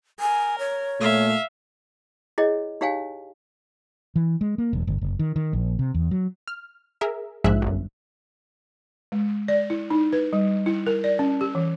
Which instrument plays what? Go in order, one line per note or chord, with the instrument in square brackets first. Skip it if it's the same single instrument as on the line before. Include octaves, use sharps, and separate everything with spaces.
[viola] A#4 [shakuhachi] G#5
[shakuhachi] C#5
[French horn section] A#2 A3 [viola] E5 F5
[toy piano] E4 G#4 C#5 D#5 G5
D#4 G4 C#5 F5 G5 G#5
[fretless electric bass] E3
G#3
A#3
E1
G1
F#1
D#3
D#3
A#1
C3
E2
F#3
[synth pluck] F6
G#4 A#4 E5
A#1 G#2 F3 G#3 E5 F#6
G1 F#2
[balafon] G#3
D5
E4
D#4
B4
G3
E4
A#4
D5
C#4
G4
E3